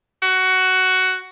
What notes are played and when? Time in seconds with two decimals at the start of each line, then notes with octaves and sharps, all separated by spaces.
0.23 F#4